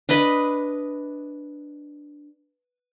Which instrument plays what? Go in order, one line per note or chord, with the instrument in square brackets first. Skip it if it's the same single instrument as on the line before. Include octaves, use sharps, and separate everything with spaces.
[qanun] D4 B4 D#5 B5